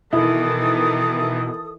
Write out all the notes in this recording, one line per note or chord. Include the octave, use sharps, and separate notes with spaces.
B2 D#3 E3 E4 A4 D#6